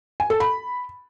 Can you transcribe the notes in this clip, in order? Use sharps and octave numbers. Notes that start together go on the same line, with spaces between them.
G#5
A4
B5